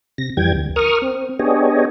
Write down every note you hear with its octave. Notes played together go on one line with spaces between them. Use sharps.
C3 A#6
F2 E3 G3 G5 G#6
D2
A#4 C#6 D#6 F6
C4
B3 D4 G4 G#4 C#5 D#5